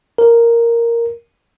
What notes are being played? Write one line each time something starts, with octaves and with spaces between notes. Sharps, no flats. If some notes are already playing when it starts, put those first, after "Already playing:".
A#4